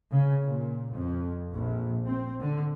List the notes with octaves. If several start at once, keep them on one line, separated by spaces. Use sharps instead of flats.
C#3
A#2
F2
A#1
C4
D3